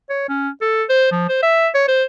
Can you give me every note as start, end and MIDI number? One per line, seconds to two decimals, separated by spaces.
0.10 0.27 73
0.29 0.49 61
0.61 0.84 69
0.90 1.08 72
1.11 1.27 53
1.29 1.42 72
1.43 1.68 76
1.75 1.84 73
1.88 2.04 72